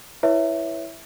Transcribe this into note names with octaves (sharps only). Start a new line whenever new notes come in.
E4 B4 C#5 E5